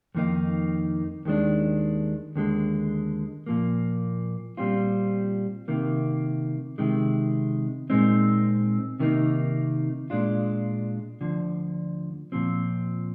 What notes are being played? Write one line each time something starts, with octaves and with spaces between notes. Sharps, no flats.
F2 D#3 A#3 D#4
D#2 D#3 G#3 D4
D#2 D3 G#3
A#2 F3 A#3
A#2 G3 C4 F4
C3 D#3 A#3
C3 D#3 G#3
A#2 G#3 C4 D#4
C3 D#3 A#3 D#4
A#2 G#3 D4 F4
D2 D3 F3
A#2 F3 C4